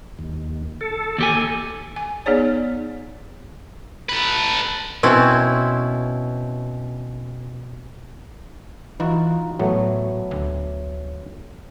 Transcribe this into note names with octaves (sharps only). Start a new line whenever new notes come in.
D#2
A4
D#2 G4 G#5
G#5
B3 D#4 G#4 C#5 D5
A4 B4
B2 C4 C#4 E4
E3 D#4 F4 F#4
A2 F#3 A3 B3
D2